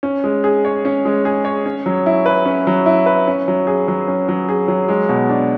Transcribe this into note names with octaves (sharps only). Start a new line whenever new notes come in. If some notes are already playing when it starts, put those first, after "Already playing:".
C#4
G#3
G#4
C#5
C#4
G#3
G#4
C#5
C#4
F#3
E4
B4
C#4
F#3
E4
B4
C#4
F#3
G#4
F#3
C#4
F#3
G#4
F#3
G#3
B2
D4